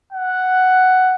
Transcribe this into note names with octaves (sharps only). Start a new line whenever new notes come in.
F#5